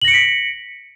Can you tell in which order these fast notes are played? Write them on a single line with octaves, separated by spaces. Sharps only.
F#7 A#6 C#7 D7 B6